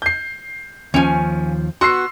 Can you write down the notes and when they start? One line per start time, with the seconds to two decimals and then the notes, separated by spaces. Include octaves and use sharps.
0.02 G6 C7
0.94 D#2 F3 C#4 G#5
1.81 B3 F#4 C6 E6 C7